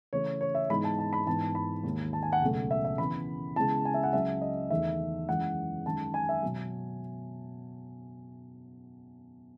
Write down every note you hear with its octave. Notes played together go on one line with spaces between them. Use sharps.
C#3 E3 A3 C#5
C#5
E5
G#2 E3 G#3 B3 D#4 B5
A5
A5
B5
G#2 E3 B3 D#4 A5
B5
D#2 D#3 G#3 D#4
A5
G#5
F#5
C#2 B2 F#3 A3
E5
E5
C#3 E3 B3 B5
C#3 G#3 B3 E4 A5
G#5
E5
F#5
C#2 C#3 F#3 E5
D#5
E2 D#3 A3 D#4 E5
F#2 E3 G#3 F#5
F#2 D#3 G#3 A5
G#5
E5
B2 F#3